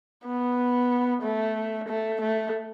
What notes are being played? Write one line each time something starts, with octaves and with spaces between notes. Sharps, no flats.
B3
A3
A3
A3